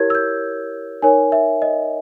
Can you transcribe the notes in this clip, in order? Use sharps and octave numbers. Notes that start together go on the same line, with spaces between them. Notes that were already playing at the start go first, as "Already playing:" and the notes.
Already playing: E4 G4 A#4 C#5 G#6
E6
G6
D#4 A#4 C#5 G#5
E5
D#5